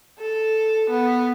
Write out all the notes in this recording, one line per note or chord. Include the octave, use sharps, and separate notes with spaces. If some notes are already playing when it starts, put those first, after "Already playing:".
A4
B3